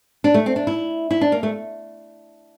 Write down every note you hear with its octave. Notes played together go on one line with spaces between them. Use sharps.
D4
A3
C4
D4
E4
E4
D4
A#3
A3